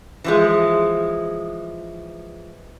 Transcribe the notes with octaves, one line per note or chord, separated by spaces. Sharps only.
E3 F3 G#3